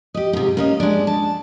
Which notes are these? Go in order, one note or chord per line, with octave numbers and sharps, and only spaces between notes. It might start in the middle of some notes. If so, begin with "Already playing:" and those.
G4 D#5
G#2 C3
A#3 C#4 D#5
G#3 D4
A5